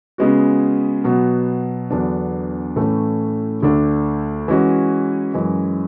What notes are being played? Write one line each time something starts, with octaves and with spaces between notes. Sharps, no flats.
C#3 G#3 B3 F#4
B2 F#3 B3
E2 D3 F#3 B3 D4
A2 E3 A3 C#4
D2 D3 A3 D4
E3 G#3 C#4 F#4
F#2 E3 G#3